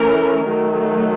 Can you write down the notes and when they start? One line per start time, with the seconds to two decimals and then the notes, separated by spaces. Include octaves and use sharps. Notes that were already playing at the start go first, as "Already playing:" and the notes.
Already playing: E3 A3 C#4 A#4
0.47 D#3 F#3 A3